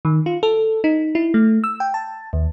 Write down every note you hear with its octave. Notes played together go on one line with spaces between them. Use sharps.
D#3
F4
A4
D#4
E4
A3
E6
G5
A5
D#2